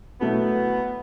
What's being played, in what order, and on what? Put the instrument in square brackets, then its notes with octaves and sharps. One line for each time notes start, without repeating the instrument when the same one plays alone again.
[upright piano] B2 F#3 A3 E4 [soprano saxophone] B3